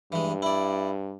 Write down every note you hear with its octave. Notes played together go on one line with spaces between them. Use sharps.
G2 E3 G#3
E4 D5